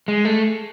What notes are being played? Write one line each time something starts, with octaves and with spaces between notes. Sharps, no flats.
G#3
A3